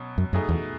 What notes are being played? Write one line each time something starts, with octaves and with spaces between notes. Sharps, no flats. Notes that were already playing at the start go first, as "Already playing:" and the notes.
Already playing: B2 F#3 C#4
F#2
F#2 B2 A3 D#4 G#4
E2